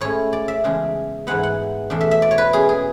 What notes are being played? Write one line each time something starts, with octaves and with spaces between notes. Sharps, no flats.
A2 G#3 C#4 E4 C#5
D5
E5
E2 C#3 G#3 D4
G#2 E3 G#3 B3 F#5
F#5
E2 B2 A3 D4
E5
E5
D5
C#5
B4
B2 G#3 C#4 G#4
G#4